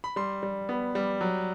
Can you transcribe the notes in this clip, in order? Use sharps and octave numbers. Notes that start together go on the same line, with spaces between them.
B5
G3 C6
G3
B3
G3
F#3